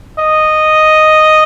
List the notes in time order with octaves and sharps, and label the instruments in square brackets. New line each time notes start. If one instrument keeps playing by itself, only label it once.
[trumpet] D#5